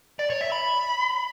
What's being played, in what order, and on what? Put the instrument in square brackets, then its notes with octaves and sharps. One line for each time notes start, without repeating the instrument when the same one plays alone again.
[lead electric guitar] D5
C#5
E5
B5